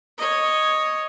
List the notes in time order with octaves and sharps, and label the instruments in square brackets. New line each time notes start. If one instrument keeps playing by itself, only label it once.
[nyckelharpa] C#5 D#5